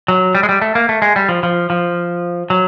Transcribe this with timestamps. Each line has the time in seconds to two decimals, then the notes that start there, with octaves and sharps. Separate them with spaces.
0.08 F#3
0.35 G3
0.43 G#3
0.49 G3
0.62 A3
0.75 A#3
0.89 A3
1.02 G#3
1.16 G3
1.29 F3
1.43 F3
1.70 F3
2.50 F#3